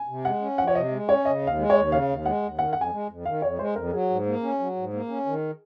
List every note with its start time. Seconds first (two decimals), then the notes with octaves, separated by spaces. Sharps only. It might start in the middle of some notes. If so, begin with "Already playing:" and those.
Already playing: G#5
0.08 C3
0.25 G#3 F#5
0.41 C#4
0.58 F3 F#5
0.67 C#5
0.75 C3 D#5
0.91 G#3
1.09 C#4 C#5
1.25 C#3 D#5
1.42 D#2
1.47 F5
1.58 G#3
1.70 C#5
1.76 D#2
1.92 C#3 F5
2.09 D#2
2.25 G#3 F#5
2.42 D#2
2.59 D#3 F#5
2.73 F2 F#5
2.81 G#5
2.92 G#3
3.09 F2
3.25 D#3 F5
3.42 F2 C#5
3.59 G#3 C5
3.76 F2 A#4
3.92 F#3 G#4
4.10 G#2
4.26 A#3
4.43 C#4
4.59 F#3
4.76 G#2
4.93 A#3
5.09 C#4
5.26 D#3